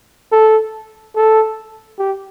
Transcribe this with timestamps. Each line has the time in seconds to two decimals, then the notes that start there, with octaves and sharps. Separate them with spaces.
0.32 A4
1.16 A4
1.99 G4